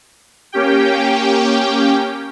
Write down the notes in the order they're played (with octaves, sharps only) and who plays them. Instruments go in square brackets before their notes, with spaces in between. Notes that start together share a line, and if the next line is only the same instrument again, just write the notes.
[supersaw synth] A#3 C#4 G4 G5